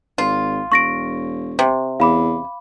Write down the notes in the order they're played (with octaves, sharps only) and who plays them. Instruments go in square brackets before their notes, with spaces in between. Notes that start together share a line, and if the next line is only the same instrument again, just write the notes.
[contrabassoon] G#1 [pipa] F4
[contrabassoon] E1 [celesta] C#6 A#6 D7
[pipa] C3
[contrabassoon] E2 [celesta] F5 B5 D6